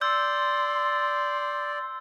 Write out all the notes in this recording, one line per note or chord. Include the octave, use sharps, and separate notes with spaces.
D5 C6 E6 G6